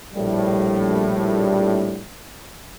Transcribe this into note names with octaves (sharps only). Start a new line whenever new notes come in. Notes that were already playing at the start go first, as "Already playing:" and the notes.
A#1 A2 G3